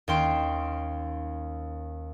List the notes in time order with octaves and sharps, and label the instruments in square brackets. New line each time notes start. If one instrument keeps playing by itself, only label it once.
[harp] D#2 C#4 G5 C6 D7